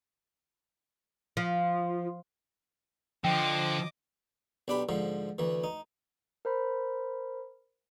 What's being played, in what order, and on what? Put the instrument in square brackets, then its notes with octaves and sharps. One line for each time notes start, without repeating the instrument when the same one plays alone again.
[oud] F3
[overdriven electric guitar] D3 [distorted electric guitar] F3 [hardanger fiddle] D#5 D6 [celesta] G5
[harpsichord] B1 D4 G4 B5
G#2 D3 F3
D2 E3
D#4
[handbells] A#4 C5 B5